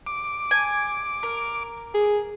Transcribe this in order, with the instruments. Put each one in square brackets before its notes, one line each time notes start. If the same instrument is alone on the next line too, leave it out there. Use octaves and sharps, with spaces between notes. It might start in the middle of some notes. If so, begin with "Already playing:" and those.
[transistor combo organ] D6
[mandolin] G#5
A#4
[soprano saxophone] G#4